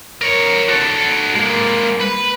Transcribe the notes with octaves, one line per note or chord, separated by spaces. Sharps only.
A#4 C#5
F#4 A4
G#3 A#3
B4